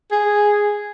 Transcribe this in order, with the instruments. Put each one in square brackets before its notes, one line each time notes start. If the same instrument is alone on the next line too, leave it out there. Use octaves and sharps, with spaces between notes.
[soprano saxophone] G#4